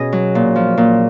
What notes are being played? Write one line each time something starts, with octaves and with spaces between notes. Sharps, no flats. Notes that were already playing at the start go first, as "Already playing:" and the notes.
Already playing: B2 C#4 G#4 D#5
F#3
A#2
F3
A#2